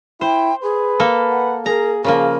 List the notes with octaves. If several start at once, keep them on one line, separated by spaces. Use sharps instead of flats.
E4 C5 G5
G#4 B4
A#3 A4
F#5
G#4 A#4 A#5
C#3 F3 A#3 G#4 A#4